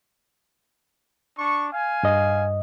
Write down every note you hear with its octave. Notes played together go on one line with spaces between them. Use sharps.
D4 C#6
F5 G#5
G2 D#5